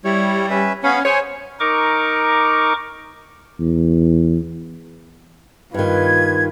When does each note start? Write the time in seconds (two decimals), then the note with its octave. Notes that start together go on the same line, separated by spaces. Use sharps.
0.05 G3 E4 C#5
0.50 C#4 B4 E5
0.84 B3 C#4 F5 B5
1.05 G#4 C5 C#5 G#5
1.60 D#4 A#4 C#6 D6
3.60 E2
5.74 G2 D#3 F4 B4 G#6